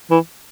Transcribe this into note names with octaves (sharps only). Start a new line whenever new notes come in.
E3